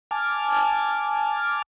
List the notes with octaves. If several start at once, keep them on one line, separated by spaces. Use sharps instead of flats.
G#5 A5 D6 F6